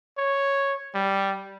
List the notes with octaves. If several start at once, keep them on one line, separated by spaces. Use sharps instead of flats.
C#5
G3